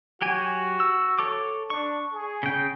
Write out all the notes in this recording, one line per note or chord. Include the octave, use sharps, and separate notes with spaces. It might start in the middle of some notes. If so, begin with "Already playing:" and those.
F#3 F#4 G4 G#5
E6
A4 C#5 D6
D4 C#6
G#4
C#3 G5